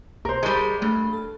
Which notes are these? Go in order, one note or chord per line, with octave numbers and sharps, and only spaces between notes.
B1 A#4 C5
G3 G#3 A5 C#6 G6
G2 A3
A4